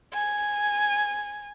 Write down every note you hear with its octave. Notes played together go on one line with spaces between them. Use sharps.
G#5